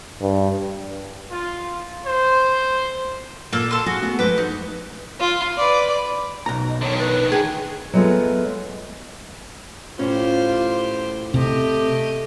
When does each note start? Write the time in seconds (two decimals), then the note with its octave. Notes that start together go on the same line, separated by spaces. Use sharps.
0.21 G2
1.32 F4
2.06 C5
3.53 A#2 A#3 A4
3.71 A4 C6
3.86 F#4 G#4
4.02 A3 B3 G#4
4.19 F2 G#3 B4 C5 D6
4.38 D#4
5.20 F4
5.57 B4 D5
6.46 B1 A#5
6.69 D#5
6.81 D3 D#3 C#5
6.98 B4
7.32 G#4 G5
7.93 F#3 G#3 A3 B3 F4 G#4
9.99 A2 C#4 F4 G4 C5
11.34 C3 A3 G4 D#5